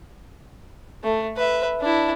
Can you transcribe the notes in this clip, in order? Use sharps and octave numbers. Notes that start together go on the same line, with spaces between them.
A3
B4 E5
D4 E4